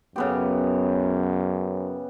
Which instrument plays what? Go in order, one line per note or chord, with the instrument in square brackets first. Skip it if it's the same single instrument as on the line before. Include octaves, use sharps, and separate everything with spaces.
[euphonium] F#2 [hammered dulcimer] C#3 B3 G4